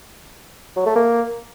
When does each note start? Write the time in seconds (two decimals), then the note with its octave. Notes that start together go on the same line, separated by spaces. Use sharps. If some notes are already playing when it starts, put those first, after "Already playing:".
0.76 F#3
0.86 A3
0.95 A#3